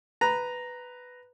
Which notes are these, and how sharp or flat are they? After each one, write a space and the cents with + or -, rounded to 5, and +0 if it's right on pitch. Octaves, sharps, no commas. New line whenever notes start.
B4 +5 A#5 +0